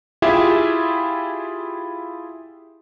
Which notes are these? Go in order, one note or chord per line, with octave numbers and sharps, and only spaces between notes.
E4 F4 G4 G#4 E5